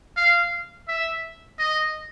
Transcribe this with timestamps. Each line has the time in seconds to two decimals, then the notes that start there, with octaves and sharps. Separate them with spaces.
0.17 F5
0.88 E5
1.59 D#5